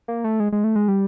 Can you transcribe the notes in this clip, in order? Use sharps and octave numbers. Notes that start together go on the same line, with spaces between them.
A#3
A3
G#3
G#3
A3
G#3
G3